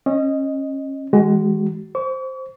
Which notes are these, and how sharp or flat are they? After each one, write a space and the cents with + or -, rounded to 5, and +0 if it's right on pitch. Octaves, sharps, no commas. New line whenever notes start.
C#4 -30 D#5 -5
E3 -30 G#3 +0 F#4 +35
C5 +0 C#6 +45